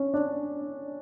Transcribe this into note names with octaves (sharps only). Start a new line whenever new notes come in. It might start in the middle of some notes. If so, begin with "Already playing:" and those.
Already playing: C#4 D4
D4